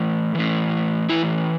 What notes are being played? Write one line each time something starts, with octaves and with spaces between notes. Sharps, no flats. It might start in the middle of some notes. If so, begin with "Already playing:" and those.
Already playing: A2 E3
A2 E3
A2 E3 E4